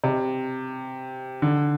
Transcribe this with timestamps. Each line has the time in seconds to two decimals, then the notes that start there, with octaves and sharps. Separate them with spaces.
0.04 C3
1.42 D3